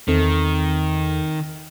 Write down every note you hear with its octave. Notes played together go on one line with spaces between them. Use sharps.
E2 D#3 C4 A4